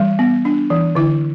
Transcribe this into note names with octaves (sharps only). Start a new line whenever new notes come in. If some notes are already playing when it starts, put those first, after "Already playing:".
Already playing: E3 G3
B3
D4
E3
D3 E4